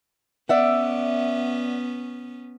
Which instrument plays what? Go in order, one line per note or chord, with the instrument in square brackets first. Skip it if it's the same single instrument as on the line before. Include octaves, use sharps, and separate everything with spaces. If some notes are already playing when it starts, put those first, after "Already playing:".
[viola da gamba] B3 C#4 [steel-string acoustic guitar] D5 E5 F#5